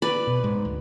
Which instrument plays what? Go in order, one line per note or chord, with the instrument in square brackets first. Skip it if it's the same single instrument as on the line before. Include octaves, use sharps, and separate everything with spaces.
[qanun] B4 D5 B5
[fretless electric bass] B2
G#2
D2